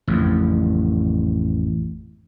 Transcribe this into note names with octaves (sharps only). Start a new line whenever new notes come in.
A1 F2